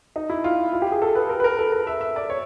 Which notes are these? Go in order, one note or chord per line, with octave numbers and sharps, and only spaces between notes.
D#4
E4
F4
F4
G4
G#4
A4
B4
A#4
B4
A#4
A4
A#4
E5
E5
D5
C#5